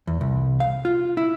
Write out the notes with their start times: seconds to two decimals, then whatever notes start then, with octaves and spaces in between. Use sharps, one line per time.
0.07 E2
0.21 C2
0.60 F5
0.85 F4
1.17 E4